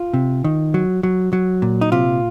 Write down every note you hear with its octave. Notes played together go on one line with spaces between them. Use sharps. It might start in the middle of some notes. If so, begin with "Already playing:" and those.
Already playing: F4
C3
D#3
F#3
F#3
F#3
A#2
D#4
C3 F4